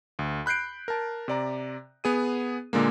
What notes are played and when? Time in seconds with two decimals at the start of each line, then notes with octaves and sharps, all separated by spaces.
0.19 D2
0.46 B5 F#6 G6 C7 D7
0.88 A#4 A5
1.28 C3 D5 A#5
2.04 B3 G#4 D#7
2.73 A#2 D3 G#3 A#3